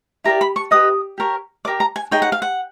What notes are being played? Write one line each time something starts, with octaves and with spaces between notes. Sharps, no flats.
E4 G4 A#4 D5 A#5
B5
C#6
G4 B4 D#5 D#6
G4 A#4 C#5
D5 D6
G4 A#4
A#5
G#5
D#4 G#4 C#5 G5
F#5
F5
F#5